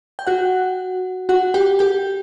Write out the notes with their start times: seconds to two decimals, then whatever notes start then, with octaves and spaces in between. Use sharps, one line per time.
0.19 G5
0.27 F#4 F#5
1.29 F#4 F#5
1.54 G4 G5
1.79 G4 G5